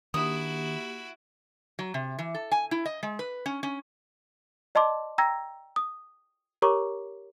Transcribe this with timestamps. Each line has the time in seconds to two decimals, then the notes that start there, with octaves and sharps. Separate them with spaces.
0.14 D#3 A#3 D4 E4 F#4 G4 D#6
1.79 F#3
1.94 C3
2.19 E3
2.35 A4
2.52 G#5
2.71 E4
2.86 D#5
3.03 G#3
3.19 B4
3.46 C#4
3.63 C#4
4.75 D5 D#5 A5 C6 D6
5.18 G5 A#5 E6 G#6 A#6
5.76 D#6
6.62 G4 A#4 C#5 A#5 C#6 D6